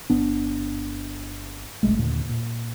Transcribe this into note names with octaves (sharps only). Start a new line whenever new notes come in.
G1 B3 D4
F#1 B1 G#3 A3
D#2 A#2 D3
A#2